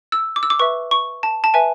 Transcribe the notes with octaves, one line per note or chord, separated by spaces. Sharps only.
E6
D6
E6
D6
B4 E5 C#6
C#6
A5
A5
B4 E5 G#5